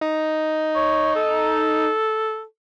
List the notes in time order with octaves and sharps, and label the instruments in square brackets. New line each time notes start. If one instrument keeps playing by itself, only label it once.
[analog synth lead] D#4
[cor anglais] C#5
A4